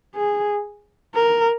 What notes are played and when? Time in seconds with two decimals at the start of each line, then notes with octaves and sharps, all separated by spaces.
0.15 G#4
1.14 A#4